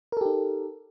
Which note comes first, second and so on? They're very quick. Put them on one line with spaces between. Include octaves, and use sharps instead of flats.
A#4 A4 G4 D#4